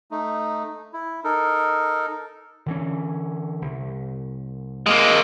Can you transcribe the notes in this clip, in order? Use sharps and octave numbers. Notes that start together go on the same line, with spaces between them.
A3 D#4
E4
D#4 A4 A#4
D3 E3 C#4
C2
G#3 A#3